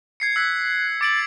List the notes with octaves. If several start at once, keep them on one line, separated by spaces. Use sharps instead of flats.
G#6 C7 C#7
E6 F#6 G#6 B6
D6 A6 D7 F#7